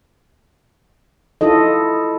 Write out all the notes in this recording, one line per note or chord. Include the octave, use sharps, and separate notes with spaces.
E4 F4 A4 D#5